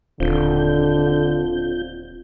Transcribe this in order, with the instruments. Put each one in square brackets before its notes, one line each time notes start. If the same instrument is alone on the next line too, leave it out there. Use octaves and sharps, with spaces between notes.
[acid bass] D#1 [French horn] D3 [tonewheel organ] C4 F4 G6